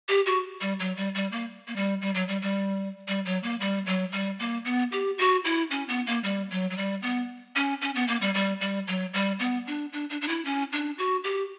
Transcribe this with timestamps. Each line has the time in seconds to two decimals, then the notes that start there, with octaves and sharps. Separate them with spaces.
0.09 G4
0.26 F#4
0.61 G3
0.80 F#3
0.97 G3
1.15 G3
1.32 A#3
1.68 A#3
1.76 G3
2.02 G3
2.15 F#3
2.28 G3
2.42 G3
3.08 G3
3.25 F#3
3.43 A#3
3.61 G3
3.86 F#3
4.12 G3
4.39 A#3
4.65 B3
4.92 G4
5.18 F#4
5.45 E4
5.71 C#4
5.89 B3
6.07 A#3
6.24 G3
6.51 F#3
6.70 F#3
6.77 G3
7.02 B3
7.56 C#4
7.82 C#4
7.95 B3
8.08 A#3
8.21 G3
8.34 G3
8.61 G3
8.88 F#3
9.14 G3
9.40 B3
9.67 D4
9.93 D4
10.10 D4
10.21 D4
10.28 E4
10.45 C#4
10.73 D4
10.98 F#4
11.24 G4